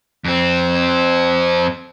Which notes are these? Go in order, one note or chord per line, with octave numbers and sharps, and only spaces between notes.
F2 C4